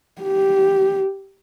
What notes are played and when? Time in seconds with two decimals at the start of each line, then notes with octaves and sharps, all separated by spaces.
0.22 G4